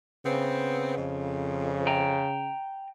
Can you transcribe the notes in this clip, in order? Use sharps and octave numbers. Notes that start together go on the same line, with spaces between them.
C#3 B3 C4
F2
G5 A#5